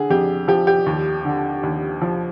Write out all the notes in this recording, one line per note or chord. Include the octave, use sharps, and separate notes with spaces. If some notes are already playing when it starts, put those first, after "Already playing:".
Already playing: D3 G#4
F2 G4
F3 G4
G4
D#2
D3
D#2
F3